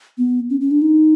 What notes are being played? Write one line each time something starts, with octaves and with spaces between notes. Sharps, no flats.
B3
C#4
C#4
D4
D#4